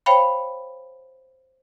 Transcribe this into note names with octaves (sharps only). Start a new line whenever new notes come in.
C5 C#5 F5 G5 B5